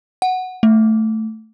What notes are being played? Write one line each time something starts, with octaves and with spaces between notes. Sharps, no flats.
F#5
A3